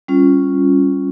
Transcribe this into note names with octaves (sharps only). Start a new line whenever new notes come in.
G3 C#4 F4